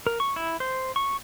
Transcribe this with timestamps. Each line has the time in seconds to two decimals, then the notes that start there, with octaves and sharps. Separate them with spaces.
0.07 A#4
0.20 C#6
0.36 E4
0.60 C5
0.96 C#6